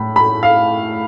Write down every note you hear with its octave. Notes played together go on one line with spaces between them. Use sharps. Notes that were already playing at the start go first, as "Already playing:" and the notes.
Already playing: A2 B5
B5
F5